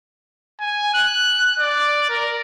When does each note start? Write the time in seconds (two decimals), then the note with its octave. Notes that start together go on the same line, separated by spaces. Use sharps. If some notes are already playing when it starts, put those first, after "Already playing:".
0.60 G#5
0.94 F#6
1.59 D5
2.09 A#4